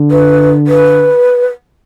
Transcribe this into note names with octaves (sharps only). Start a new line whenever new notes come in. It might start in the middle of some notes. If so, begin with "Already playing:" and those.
Already playing: D3
B4
B4